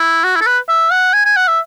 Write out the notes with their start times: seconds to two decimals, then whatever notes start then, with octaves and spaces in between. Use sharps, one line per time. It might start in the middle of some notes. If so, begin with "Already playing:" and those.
Already playing: E4
0.24 F#4
0.36 E4
0.41 A4
0.47 B4
0.69 E5
0.92 F#5
1.14 G#5
1.25 G#5
1.37 F#5
1.48 E5